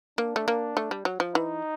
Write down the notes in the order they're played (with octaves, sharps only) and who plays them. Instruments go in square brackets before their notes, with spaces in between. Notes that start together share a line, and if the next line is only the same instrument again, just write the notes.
[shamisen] A#3 [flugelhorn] D4
[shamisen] A3
A#3
A3
G3
F#3
F3
[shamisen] E3 [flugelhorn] D#4